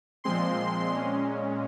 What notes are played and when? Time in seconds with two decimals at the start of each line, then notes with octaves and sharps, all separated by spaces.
0.24 A#2 F3 G#3 C4 C6
0.92 A#2 G#3 C#4